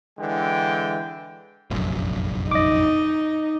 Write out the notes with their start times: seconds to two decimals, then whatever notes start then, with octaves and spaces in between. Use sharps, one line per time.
0.19 D3 E3 G#3 G5
1.70 F1 A#1 F#2
2.51 D#4 D#5 D6